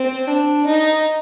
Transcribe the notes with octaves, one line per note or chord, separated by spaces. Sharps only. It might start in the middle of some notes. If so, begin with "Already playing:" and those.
Already playing: C4
D4
D#4